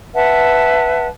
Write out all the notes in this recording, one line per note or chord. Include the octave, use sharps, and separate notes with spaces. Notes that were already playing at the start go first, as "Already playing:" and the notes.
B4 E5 F#5 A5